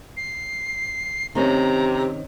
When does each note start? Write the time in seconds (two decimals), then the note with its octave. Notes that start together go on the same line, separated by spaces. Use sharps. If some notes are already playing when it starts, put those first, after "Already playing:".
0.17 C7
1.35 C3 D#3 C4 C#4 A#5